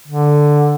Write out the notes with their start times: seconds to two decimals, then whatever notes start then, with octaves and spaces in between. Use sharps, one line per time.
0.08 D3